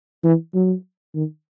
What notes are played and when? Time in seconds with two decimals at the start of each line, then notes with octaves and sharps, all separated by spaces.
0.24 E3
0.55 F#3
1.15 D#3